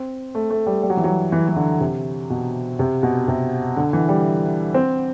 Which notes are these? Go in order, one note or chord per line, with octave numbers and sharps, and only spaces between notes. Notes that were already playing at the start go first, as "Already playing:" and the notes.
Already playing: C4
A3
A3
G3
G3
F#3
E3
F#3
E3
E3
D3
C3
B2
C3
B2
C3
D3
E3
G3
C4